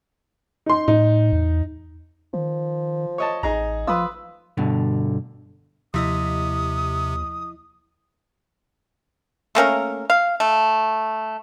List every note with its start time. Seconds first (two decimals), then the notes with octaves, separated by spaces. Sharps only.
0.66 D#4 C6
0.88 A2 D#4
1.33 E2
2.33 D#3 F3
3.18 C#5 D#5 A5
3.43 A1 D#4 G#4 A#5
3.87 F3 F4 B4 D#6 E6
4.57 G2 B2 D3
5.94 D#2 C3 F3 E4 D#5 D#6
9.55 A3 A#3 C#4 A#4
10.10 F5
10.40 A3